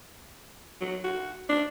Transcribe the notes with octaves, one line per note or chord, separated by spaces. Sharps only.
F#3
F#4
D4